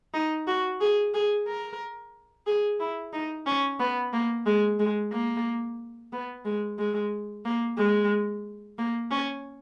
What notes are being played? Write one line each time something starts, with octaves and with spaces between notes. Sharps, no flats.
D#4
F#4
G#4
G#4
A#4
G#4
E4
D#4
C#4
B3
A#3
G#3
G#3
A#3
B3
G#3
G#3
A#3
G#3
A#3
C#4